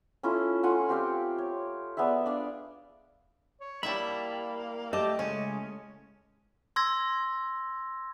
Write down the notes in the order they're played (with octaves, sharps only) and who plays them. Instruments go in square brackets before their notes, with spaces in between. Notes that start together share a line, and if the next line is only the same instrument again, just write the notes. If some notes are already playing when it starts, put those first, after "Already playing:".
[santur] C#4 E4 F4 A4
A3 F4 F#5 G#5
C4 G4 F5 G5
C#5
B3 G#4 D5 E5
D4 D5 F5
[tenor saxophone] C#5
[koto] G3 E4 E5 [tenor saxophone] A#3 [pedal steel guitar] A5 B5
[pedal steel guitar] A3 A5 D6 [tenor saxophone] G4 [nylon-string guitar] D#5
[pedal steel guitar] C#3 G#3 [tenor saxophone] A3 [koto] C#4
[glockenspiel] C6 E6 G#6 A#6